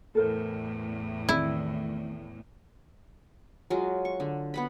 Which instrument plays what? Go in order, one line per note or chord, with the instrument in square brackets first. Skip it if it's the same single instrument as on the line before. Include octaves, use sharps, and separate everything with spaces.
[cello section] E2 A2 [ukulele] A4 A#4 C5
[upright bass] D#3 C4 [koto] E4 [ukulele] G#4 D5
[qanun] F#3 G#3 F4
C#6
D3
B3 F#5 B5